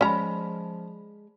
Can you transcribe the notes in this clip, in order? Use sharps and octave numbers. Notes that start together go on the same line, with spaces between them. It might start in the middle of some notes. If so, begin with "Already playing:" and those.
F3 G#3 C#4 D5 A#5 B5